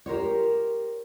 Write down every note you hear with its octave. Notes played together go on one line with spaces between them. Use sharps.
G4 A#4 C5 C#5